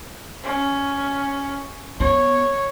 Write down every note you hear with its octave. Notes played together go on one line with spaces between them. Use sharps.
C#4
B3 C#5